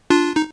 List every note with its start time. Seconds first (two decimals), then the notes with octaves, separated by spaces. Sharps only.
0.10 D4 F4
0.36 D#4